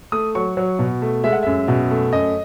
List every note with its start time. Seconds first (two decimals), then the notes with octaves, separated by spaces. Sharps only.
0.12 A3 D#6
0.35 F#3 C#6
0.57 F#3
0.79 B2
1.02 A3
1.24 G#3 E5
1.33 F#5
1.43 F#2 E5
1.68 B2
1.91 A3
2.13 F#2 D#5